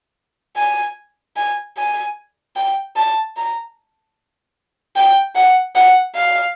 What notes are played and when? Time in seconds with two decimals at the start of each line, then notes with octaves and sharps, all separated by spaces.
0.57 G#5
1.36 G#5
1.77 G#5
2.56 G5
2.96 A5
3.36 A#5
4.96 G5
5.35 F#5
5.75 F#5
6.15 F5